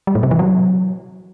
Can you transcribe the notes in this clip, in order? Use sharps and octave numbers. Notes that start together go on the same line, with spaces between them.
G3
A2
C3
E3
F#3